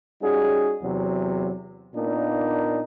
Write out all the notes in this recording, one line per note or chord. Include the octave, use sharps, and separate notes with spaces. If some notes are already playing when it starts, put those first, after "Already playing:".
G3 C#4 D#4 F#4 G#4
E2 C3 F#3
A#2 A#3 B3 D4 D#4